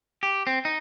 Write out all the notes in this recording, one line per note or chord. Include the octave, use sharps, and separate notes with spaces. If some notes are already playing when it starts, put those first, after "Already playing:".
G4
C4
D#4